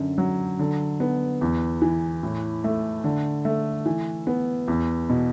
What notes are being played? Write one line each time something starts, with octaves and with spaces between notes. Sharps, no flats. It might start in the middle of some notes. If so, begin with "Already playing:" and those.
Already playing: F#2 D3
F#3
D3
B3
E2
E3
A2
A3
D3
A3
E3
B3
E2
B2